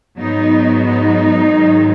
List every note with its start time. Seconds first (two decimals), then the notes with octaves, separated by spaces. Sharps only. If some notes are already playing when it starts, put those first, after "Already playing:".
0.18 G#2 F#3 B3 D#4
0.85 D#4
1.52 G#2 D#3 F#3